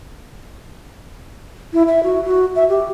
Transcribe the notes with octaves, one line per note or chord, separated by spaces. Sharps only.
E4
E5
F#4
F#4
E5
G4